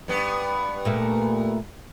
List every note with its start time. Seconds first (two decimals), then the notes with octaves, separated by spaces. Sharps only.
0.08 G2 B3
0.85 A#2 A3 A#3